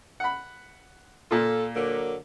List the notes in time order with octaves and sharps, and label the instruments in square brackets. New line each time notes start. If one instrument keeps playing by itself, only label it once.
[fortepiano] F#5 B5
[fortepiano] A#2 F4 [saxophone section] A4
[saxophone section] D3 F#3 A#3